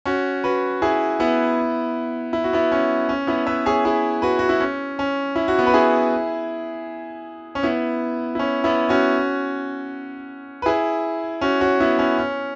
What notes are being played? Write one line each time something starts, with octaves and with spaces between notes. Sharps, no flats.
C#4 F#4
F#4 B4
E4 G#4
B3 E4
E4
F#4
B3 E4
C#4
C#4
B3 E4
B4 E5
G#4 C#5
E4 G#4
F#4 B4
F#4
E4
C#4
C#4
E4
F#4
B3 E4
B4
E4 G#4
C#4
B3 E4
E4
C#4
B3 E4
C#4 F#4
B4
E4 G#4
C#4 F#4
C#4 F#4
B3 E4
C#4
C#4